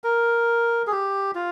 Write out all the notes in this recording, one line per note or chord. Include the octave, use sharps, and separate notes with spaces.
A#4
G#4
G4
F4